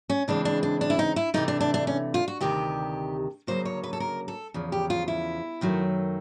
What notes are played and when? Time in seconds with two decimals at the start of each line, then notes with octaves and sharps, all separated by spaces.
0.10 C#4
0.28 C#3 E3 G#3 C4 D4
0.45 D4
0.63 D4
0.81 D4
0.90 E4
0.99 D#4
1.16 E4
1.34 C3 E3 A3 D#4
1.48 D4
1.60 D4
1.74 D4
1.87 C#4
2.14 F4
2.28 F#4
2.40 D2 C3 D#3 G4
3.47 D2 C#3 F#3 A#3 C5
3.65 C#5
3.83 B4
3.93 A4
4.00 A#4
4.28 A4
4.54 E2 C#3 F3
4.72 G4
4.90 F4
5.08 E4
5.61 F#2 D#3 F#3 A3